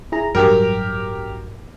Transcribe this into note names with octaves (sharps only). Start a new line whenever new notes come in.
E4 G#4 A#5
A1 G2 F#3 G4 A#4